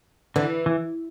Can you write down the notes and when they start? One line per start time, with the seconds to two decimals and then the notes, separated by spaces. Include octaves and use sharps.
0.36 D3 E3
0.66 E3